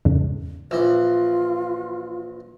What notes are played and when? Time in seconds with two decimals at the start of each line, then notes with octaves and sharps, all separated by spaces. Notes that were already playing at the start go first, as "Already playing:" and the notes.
0.05 E2 G#2 C#3
0.71 A#1 E3 F4 E6